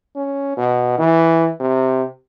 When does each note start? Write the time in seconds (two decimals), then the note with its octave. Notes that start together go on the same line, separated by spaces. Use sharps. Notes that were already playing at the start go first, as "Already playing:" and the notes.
0.16 C#4
0.57 B2
0.98 E3
1.60 C3